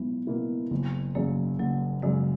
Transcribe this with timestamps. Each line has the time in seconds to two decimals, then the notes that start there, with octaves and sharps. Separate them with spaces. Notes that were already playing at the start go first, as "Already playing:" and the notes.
Already playing: B1 B2 G#3 B3 E4
0.27 B2 A#3 E4
0.71 F#1
1.15 F#2 C#3 F#3 A#3
1.59 F#1 F#3 A#3
2.02 F#2 C#3 G#3